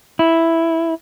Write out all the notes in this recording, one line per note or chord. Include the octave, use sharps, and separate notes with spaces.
E4